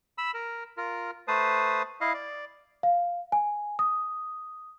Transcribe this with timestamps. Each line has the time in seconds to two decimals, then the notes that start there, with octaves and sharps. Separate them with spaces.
0.18 B5 E6
0.34 A#4
0.77 F4 A#4
1.28 A3 B4 C5 A5 D#6
2.01 E4 D#5 F5
2.14 D5
2.83 F5
3.32 G#5
3.79 D#6